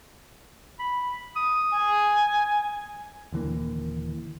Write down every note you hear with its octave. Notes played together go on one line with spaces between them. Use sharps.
B5
D#6
G#5
D#1 D3 E3 A#3